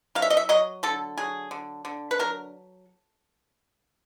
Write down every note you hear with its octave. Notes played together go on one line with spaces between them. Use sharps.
F#3 F5
E5
D#5
E5
F#3 D#5
D3 A4
F#3 G#4
D3
D3
B4
F#3 A#4